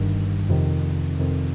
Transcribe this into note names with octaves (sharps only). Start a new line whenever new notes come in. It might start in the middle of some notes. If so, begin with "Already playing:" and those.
Already playing: G1 G2 D#3
F2 C3 D#3
F2 C3 D#3